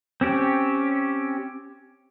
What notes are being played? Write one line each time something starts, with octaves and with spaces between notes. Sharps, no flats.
C4 C#4 G4